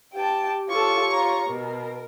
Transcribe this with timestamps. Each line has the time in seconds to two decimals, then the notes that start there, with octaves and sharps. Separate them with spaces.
0.14 G4 G5 A5
0.69 F4 A4 C#5 C#6
1.11 F4 A#5
1.47 B2 A#4